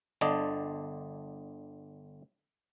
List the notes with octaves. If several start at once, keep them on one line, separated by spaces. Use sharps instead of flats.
G1 D3 D5 D#5 A5